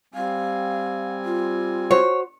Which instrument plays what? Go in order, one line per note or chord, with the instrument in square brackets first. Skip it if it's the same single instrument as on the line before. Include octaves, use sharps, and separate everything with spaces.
[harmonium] G3 C4 G#5 [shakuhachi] F5
[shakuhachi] F4
[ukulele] F#4 C5 [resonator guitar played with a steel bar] C#5